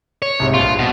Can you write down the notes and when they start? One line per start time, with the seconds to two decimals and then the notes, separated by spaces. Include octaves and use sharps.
0.22 C#5
0.40 C2 G#2 C3
0.54 A#1 G2 F4
0.79 B2